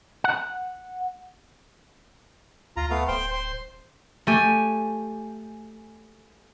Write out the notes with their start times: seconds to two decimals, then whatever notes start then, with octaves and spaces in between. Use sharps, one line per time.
0.24 F#5
2.77 D2 F4 A#5
2.90 A3 B3 F5
3.08 D1 C5 G5 C6
3.31 C5 C6
4.27 A3 G4 G#5